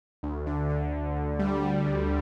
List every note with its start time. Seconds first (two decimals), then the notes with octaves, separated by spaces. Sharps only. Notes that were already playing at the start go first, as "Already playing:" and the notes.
0.23 D2
0.46 D3
0.70 D3
0.93 D2
1.16 D2
1.39 G3
1.63 G3
1.86 D2